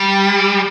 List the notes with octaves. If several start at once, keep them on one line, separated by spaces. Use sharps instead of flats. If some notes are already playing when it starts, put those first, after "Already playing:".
Already playing: G3